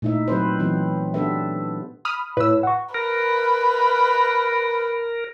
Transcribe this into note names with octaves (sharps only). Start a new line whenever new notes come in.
A#2 A3 D#4 E4 E5
F#3 C4 B4 C5
E3 F#3 B3 C4
B3 D4 G4 A4 B4 E5
B5 D#6 F6
A2 E4 B4 C#5 E6
F#5 C#6
A#4 B4